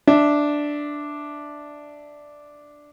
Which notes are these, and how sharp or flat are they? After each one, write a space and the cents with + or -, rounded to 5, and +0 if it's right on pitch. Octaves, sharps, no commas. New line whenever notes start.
D4 +0 E5 -5